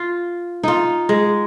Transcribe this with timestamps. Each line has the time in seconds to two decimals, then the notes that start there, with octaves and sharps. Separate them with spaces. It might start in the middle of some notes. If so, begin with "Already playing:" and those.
Already playing: F4
0.63 D#4 F4
1.09 G#3